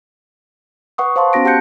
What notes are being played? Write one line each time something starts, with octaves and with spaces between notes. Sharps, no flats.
B4 F#5 C#6 D#6
C5 F5 A5 C6
B3 C#4 F#4 A#6 D7
G4 F#5 A5 F#6 G6 C#7